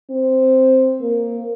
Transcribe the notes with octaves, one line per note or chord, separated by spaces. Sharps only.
C4
A#3